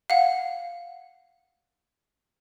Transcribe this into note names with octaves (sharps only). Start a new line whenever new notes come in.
F5 F#5